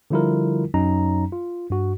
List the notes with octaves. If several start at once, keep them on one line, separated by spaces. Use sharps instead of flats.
D3 F3 G3 E4 F4 A#4
F#2 F#3 C#4 D#4 A#5
F4
G2 F#4